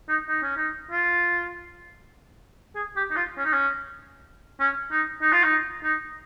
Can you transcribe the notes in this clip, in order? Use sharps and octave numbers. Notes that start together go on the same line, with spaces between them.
D#4
D#4
C#4
D#4
F4
G#4
G4
D#4
F4
C#4
D#4
C#4
C#4
D#4
D#4
F4
D#4
D#4